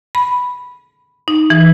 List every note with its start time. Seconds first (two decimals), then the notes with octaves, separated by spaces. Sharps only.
0.15 B5
1.28 D#4
1.50 E3